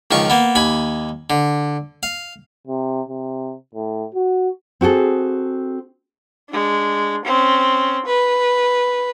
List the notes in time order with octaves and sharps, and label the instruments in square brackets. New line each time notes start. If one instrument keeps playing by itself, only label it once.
[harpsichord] C#2 D#3 F3 C#6
A#3 B3
D#2 G#5 B5
D3
F5
[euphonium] C3
C3
A2
F#4
[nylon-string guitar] C4 F#4 G#4 A4
[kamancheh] G#3 D4
C4 C#4
B4